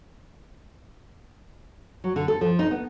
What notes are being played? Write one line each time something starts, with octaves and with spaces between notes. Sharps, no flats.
F#3
D3
A4
F3
D#4
B3